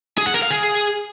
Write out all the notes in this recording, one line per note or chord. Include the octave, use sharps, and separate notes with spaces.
G#4
F#5
A#4
F5
G#4